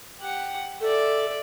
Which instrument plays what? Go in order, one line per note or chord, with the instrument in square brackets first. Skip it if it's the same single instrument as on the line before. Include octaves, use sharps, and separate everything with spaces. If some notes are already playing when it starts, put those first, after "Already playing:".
[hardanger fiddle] G4 F#5
[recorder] A4 [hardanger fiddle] D5 E5